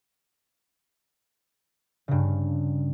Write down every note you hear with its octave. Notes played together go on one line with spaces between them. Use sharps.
G2 C#3